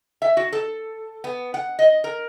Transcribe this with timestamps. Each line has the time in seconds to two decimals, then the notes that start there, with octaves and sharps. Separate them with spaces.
0.22 E5
0.37 F#4
0.52 A4
1.24 B3
1.54 F#5
1.79 D#5
2.04 A#4